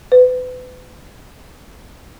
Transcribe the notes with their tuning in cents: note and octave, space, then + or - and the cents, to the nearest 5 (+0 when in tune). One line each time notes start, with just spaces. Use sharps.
B4 +35